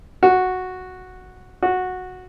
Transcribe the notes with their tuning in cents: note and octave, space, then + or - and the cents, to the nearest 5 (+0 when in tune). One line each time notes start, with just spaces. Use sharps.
F#4 -5
F#4 -10